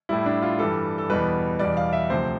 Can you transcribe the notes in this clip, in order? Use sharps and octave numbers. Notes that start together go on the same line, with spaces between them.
A2 G3 E4
D4
F4
G2 E3 G3 A4
A4
E2 B2 G3 B4
E2 B2 G3 D5
F5
E5
D2 C3 F3 C5